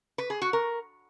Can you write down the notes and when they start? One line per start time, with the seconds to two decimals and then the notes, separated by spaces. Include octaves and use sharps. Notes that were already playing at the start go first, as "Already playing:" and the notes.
0.18 B4
0.30 G#4
0.42 F#4
0.53 A#4